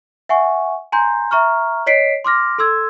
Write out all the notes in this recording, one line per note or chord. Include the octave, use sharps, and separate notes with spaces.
E5 F#5 G#5 C#6
G#5 A#5 C6 G6
E5 A#5 C#6 F6
C#5 D#5 B6 C7 D7
C6 D6 F6 A#6
A4 C6 E6 G#6